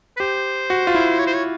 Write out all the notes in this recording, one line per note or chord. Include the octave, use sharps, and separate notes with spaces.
B4
G4 C5
F#4
F4
E4
C#5
C5
C#5